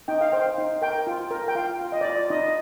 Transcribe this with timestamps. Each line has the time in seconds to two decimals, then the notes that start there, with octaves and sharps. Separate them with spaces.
0.08 D#4 G5
0.21 F5
0.32 C5 G5
0.58 D#4
0.82 A#4 G5
1.07 F4
1.31 A#4
1.48 G5
1.55 F4 F5
1.81 F4
1.92 D#5
2.01 D5
2.05 F4
2.16 D5
2.30 D#4 D#5